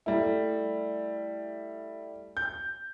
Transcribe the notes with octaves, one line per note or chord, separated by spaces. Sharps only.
G3 A3 E4
G6